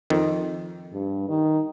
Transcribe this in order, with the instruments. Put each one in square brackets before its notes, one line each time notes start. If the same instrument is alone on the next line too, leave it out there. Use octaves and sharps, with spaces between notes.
[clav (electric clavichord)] F2 D#3
[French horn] G2
D#3